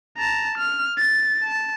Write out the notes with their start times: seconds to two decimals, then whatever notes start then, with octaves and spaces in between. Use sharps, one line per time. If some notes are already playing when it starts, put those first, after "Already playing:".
0.17 A5 A#5
0.58 F6
0.98 A6
1.43 A5